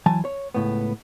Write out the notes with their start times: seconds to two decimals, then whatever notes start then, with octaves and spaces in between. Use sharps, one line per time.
0.06 E3 F#3 G#5 A5
0.25 C#5
0.54 C#2 A2 B3